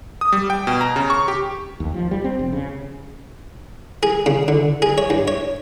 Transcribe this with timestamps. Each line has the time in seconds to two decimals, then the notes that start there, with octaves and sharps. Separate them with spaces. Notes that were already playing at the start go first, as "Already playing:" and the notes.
0.21 D#6
0.32 G3
0.50 G5
0.67 B2
0.81 A#5
0.96 C#3
1.10 C#6
1.28 G4
1.80 D#2
1.94 F3
2.11 G3
2.24 C4
2.39 F1
2.53 C#3
4.03 G#4
4.26 C#3
4.48 D3
4.82 G#4
4.98 C#5
5.10 G2
5.28 C#5